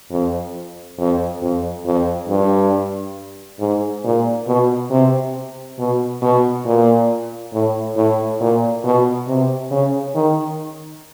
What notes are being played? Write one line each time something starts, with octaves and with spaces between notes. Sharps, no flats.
F2
F2
F2
F2
G2
G#2
A#2
B2
C3
B2
B2
A#2
A2
A2
A#2
B2
C3
C#3
D#3